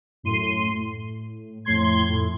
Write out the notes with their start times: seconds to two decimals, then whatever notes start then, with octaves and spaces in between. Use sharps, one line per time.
0.23 F#2 A2 C6 D#7
0.73 A2
1.65 F2 A2 C6 G#6
2.08 F2 A2